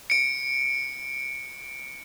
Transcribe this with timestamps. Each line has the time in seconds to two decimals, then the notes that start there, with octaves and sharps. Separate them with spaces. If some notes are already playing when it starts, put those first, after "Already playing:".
0.10 C#7 D7